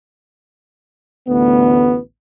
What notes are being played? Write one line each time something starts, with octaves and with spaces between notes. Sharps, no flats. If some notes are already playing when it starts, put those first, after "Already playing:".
A1 D2 B3